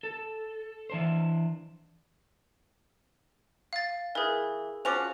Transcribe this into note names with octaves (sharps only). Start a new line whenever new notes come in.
A4
E3 D4 C5
F5 A6
E3 G#4 A#4
F3 C#4 F#4 D6 F7